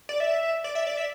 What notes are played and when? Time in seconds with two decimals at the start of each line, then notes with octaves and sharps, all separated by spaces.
0.09 D5
0.20 E5
0.64 D5
0.75 E5
0.87 D5
0.97 E5